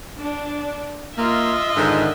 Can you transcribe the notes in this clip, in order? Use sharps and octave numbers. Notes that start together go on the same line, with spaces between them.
D4
A#3 F4 D#5 E5
G#2 D3 D#3